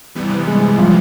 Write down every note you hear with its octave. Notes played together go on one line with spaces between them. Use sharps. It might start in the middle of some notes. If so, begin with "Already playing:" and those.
C3 E3 G3 B3
G#3
F3